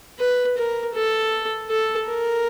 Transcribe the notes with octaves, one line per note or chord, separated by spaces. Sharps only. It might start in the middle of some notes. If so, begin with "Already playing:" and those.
B4
A#4
A4
A4
A#4